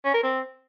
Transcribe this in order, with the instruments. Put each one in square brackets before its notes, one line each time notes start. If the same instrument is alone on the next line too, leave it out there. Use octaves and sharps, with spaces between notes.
[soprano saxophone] C#4
A#4
C4